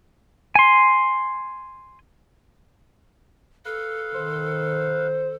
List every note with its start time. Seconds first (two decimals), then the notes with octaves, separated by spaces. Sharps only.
0.55 G#5 C6
3.65 A4 B4 F5
4.14 D#3 C5